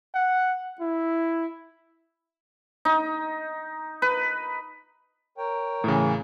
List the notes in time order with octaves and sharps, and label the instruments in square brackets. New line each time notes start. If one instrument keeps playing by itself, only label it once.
[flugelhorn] F#5
E4
[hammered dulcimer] D#4
B4
[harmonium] A#4 C#5 G5
[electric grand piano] A2 C#3 [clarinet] E3